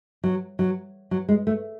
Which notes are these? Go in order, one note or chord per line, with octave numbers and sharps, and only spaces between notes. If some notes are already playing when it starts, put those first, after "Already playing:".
F#3
F#3
F#3
G#3
A3